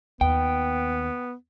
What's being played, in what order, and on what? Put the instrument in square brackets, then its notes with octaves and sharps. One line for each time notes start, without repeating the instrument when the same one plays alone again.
[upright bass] D#2 [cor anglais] B3 [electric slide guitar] G5